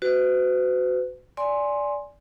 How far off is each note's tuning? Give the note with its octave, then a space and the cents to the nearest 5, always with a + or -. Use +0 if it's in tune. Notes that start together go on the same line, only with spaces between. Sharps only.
F#4 +0 B4 +45
D5 -10 G#5 +0 C6 +10